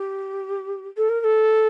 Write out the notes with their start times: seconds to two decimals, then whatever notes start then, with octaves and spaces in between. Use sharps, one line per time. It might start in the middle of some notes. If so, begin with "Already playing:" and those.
Already playing: G4
0.97 A4
1.09 A#4
1.20 A#4
1.24 A4